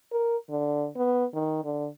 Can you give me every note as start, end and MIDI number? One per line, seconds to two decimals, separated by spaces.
0.12 0.37 70
0.49 0.88 50
0.97 1.25 59
1.34 1.60 51
1.64 1.88 50